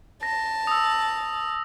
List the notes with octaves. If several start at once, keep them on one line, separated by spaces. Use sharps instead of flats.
A5 A#6
D#6 E6